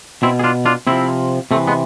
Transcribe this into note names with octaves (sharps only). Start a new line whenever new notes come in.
B2 C4 E4
G#4
D4 F4
D4 F4
C3 F3 C4 E4
C3 E3 A3 C4
G#3 B3